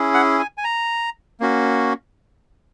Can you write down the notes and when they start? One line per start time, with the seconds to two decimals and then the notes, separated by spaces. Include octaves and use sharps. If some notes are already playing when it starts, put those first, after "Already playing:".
Already playing: C#4 E4 G#4
0.14 F#5
0.39 G#5
0.58 G#5
0.64 A#5
1.40 A#3 C#4 F#4